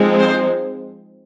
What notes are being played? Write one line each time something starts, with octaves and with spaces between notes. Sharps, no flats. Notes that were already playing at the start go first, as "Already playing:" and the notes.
Already playing: F3 G#3 C4 D#4
C5